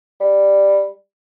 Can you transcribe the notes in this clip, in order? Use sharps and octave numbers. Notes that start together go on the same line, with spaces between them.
G3